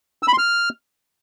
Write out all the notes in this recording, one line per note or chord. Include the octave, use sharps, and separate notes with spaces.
E6
B5
C6
F6